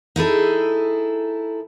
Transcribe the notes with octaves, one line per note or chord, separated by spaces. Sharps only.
D#4 E4 G#4 A4